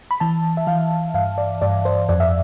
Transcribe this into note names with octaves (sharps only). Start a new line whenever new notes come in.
B5
E3 A5
E5
E3 F5
G2 F5
D5
G2 D5
C5
F2 D5
E5